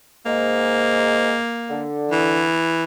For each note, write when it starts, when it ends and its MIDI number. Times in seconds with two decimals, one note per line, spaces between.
0.26 1.37 44
0.26 1.37 56
0.26 1.85 58
1.69 2.44 50
2.11 2.84 52